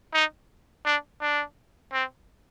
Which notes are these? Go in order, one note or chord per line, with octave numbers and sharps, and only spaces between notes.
D#4
D4
D4
C4